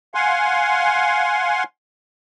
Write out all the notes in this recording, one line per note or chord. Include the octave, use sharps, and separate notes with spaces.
F5 F#5 G#5 C6